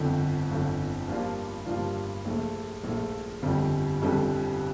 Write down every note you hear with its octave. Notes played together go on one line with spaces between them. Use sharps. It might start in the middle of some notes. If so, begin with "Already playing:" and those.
Already playing: G1 F2 D3
G1 F2 D3
G2 F3 A#3 D4 F4
G2 F3 A#3 D4 F4
A#1 A#2 A3
A#1 A#2 A3
G1 F2 D3 G3
G1 F2 D3 G3